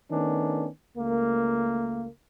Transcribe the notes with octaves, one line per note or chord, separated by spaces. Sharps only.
D#3 A3 B3 C#4 D4
C#2 A3 A#3